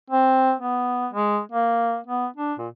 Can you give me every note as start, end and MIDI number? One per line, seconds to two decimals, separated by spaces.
0.10 0.53 60
0.60 1.08 59
1.13 1.40 56
1.52 1.98 58
2.07 2.27 59
2.37 2.53 62
2.59 2.68 46